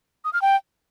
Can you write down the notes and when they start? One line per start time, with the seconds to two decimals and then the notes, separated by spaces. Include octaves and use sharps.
0.25 D#6
0.33 F6
0.42 G5